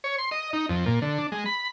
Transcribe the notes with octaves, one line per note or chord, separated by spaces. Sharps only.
C#5
C6
D#5
D#4
F2
A#2
D3
D4
G#3
B5